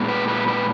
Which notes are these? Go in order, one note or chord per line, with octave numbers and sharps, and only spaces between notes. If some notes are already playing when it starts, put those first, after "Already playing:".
Already playing: A#2 G#3 B3
B4
B4
B4